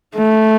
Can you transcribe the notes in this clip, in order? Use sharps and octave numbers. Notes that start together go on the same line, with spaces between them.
A3